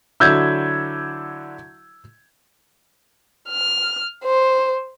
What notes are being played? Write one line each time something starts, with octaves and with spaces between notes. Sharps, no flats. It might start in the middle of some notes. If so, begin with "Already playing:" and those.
D3 F#3 E4 E6 G6 G#6
F6
C5